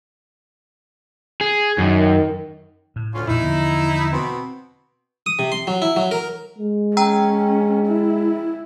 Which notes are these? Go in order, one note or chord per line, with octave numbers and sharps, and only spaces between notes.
G#4
F#2 D#3
A2
D2 C#4 F4
A#1 F2 A#2 D#4 E4
E2 D3 F3
B2 B3 C4
D#6
C3
C6
F#3
E4
F#3
A#4
G#3
C#4 G5 A#5 E6
E4